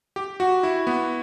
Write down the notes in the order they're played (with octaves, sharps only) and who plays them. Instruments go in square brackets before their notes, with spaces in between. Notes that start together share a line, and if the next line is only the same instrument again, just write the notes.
[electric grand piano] G4
F#4
E4
B3